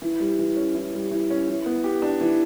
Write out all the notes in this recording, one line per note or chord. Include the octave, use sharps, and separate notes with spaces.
E3
G3
E3
C#4
E3
G3
E3
C#4
E3
B3
G4
D4
E3